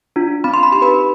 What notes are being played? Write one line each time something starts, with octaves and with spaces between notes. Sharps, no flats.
D4 F4
C4 B5
C6
B5
D#4 G4 C6
B4 B5